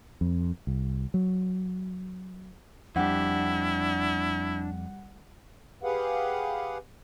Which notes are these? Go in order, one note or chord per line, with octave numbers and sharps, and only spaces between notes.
F2
C2
F#3
F2 G3 D4 E4 G4 F#5
G4 G#4 B4 F5 F#5